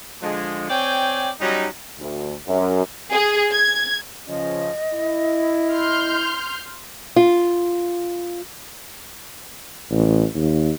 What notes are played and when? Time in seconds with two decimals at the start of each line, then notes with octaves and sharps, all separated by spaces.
0.22 D3 F3 G#3
0.70 C4 C#5 D5 G5 G#5
1.40 F#3 G3 C#4 D#4
1.99 D2
2.48 F#2
3.13 G#4
3.52 G#6
4.28 C#3 F3 C#4 D#5
4.92 E4
5.72 C6 F6 G6
7.16 F4
9.91 A1
10.34 D#2